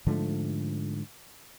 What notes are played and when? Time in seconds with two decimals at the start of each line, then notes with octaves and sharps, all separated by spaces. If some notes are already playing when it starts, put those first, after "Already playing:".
0.07 G#2 D3 F3 A3